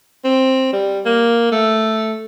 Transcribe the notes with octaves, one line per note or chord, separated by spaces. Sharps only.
C4
G3
A#3
A3